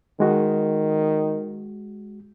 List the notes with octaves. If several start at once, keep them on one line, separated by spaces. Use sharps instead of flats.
D#3 G#3 F#4